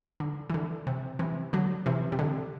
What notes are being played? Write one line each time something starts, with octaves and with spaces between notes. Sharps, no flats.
D3
E3
D3
C3
C3 E3
D3 F#3
C3 E3
C3
D3